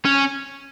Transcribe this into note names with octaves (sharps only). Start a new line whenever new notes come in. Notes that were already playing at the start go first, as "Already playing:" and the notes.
C#4